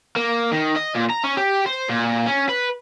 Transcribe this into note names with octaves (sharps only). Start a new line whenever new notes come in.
A#3
D#3
D#5
A#2
A#5
C#4
G4
C5
A#2
C#4
B4